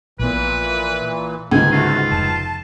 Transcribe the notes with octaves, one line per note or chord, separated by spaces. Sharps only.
A#1 A#2 E3 B3 B4
C#2 G#2 D3 G3 A#3 G#5
D2 A3 F4 F#4
F1 A5